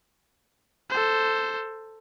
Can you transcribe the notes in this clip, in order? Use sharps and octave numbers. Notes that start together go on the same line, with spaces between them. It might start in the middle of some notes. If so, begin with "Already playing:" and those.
A4 C5